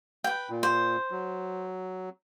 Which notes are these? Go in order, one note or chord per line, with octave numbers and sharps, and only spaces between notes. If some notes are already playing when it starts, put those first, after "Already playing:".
B4 G5
A#2
C5
F#3